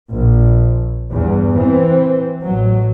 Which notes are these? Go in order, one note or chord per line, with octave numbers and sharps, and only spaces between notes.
A#1
E2 G2
E3 C4
A1 F#3